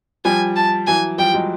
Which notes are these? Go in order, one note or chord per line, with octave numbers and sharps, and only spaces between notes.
F3 G3 G#5
A5
E3 F#3 G#5
F3 G3 G5
F#3 G#3